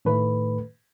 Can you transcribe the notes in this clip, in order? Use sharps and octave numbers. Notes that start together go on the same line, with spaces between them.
A2 D#3 A3 B4